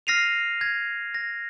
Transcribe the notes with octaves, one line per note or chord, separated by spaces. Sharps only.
F6 A#6 C7 D#7 F7
G#6 A#6
A#6